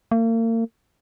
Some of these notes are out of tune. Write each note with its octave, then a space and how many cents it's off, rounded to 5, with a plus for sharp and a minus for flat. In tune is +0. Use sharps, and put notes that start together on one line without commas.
A#3 -40